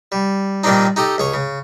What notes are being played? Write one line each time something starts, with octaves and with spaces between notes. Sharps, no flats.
G3
A#2 D#3 G3 C4 D4 D#4
D#4 G4 A4 D#5
C#2 G#4 C#5
C#3